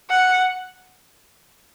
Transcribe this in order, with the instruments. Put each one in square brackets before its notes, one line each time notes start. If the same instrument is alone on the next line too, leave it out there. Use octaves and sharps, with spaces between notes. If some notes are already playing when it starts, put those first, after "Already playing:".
[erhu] F#5